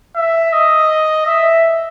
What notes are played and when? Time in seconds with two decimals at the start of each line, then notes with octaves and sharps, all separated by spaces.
0.16 E5
0.53 D#5
1.26 E5